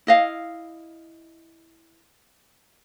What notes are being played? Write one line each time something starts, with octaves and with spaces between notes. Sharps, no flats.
E4 D#5 F5